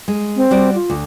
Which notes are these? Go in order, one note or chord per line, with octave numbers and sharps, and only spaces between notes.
G#3
C4
G3 F#4 D5
F4
D2